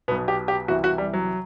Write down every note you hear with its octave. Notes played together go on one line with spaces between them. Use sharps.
B1 B2 B3
G4
G4
C2 C3 E3 F#4
F#4
G3
F#3